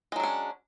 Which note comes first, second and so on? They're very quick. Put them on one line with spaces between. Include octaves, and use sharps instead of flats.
G#3 F#3 D4 C#4